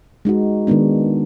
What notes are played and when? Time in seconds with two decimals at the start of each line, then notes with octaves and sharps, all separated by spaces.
0.25 G#3 D#4 F#4
0.67 D#3 G#3 B3 D4